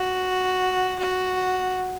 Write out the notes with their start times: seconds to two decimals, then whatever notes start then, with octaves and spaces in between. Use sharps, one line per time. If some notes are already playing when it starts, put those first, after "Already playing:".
Already playing: F#4
1.00 F#4